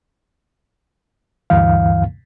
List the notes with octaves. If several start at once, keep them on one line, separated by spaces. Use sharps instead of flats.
D2 G2 E3 F5